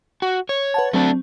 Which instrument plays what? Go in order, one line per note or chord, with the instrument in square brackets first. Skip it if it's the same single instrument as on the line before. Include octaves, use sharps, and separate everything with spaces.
[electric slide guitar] F#4
C#5
[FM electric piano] B4 F#5 A5
[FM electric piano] F#3 C4 [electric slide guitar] A3 D4